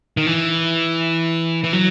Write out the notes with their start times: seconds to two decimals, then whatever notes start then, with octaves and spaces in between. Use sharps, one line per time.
0.17 D#3
0.26 E3
1.64 E3
1.73 F#3